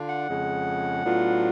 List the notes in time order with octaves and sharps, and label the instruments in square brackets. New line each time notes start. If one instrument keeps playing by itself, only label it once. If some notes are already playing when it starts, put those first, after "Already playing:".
Already playing: [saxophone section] D3 D4 F4
F#5
F2 C#3 G#3
A2 F#3 B3 D4 F4